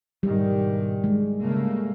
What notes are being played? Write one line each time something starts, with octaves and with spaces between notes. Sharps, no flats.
G#2 B2 D#3 G3
G#3
C#3 A3 A#3